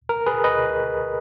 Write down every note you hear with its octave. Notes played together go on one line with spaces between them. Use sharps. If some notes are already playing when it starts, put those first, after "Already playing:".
A#4
G#4 B4
B4 D#5